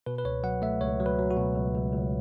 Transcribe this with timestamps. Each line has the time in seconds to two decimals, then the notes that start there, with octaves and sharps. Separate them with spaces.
0.06 B2 B4
0.18 B4
0.25 C#2 C#5
0.43 F#3 F#5
0.62 A3 E5
0.81 C#2 C#5
1.00 F#3
1.06 B4
1.19 F#3
1.31 F#4
1.37 B2
1.56 C#2
1.75 C#2
1.93 C#2